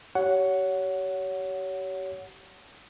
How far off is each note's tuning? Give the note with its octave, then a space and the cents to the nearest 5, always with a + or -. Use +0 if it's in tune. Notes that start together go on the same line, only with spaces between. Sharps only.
G4 -35 C#5 +20 F#5 +0